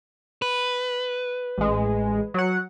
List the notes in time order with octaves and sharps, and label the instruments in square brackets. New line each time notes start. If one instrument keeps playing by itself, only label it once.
[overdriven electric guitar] B4
[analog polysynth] A1 G#3
F#3 F#5